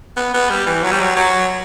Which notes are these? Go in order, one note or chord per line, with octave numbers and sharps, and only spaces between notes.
B3
B3
G3
E3
F#3
G3
F#3
F#3